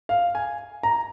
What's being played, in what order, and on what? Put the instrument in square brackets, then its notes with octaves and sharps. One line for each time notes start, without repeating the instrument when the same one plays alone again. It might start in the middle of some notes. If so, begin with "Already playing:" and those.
[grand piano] F5
G#5
A#5